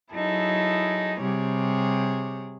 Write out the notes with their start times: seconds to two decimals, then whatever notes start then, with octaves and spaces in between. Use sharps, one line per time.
0.12 F#3 D#4 E4 G#4 A4
1.20 C3 G3 G#4 C#5